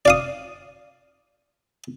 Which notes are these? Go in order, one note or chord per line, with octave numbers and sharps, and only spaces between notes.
D5 F5 D#6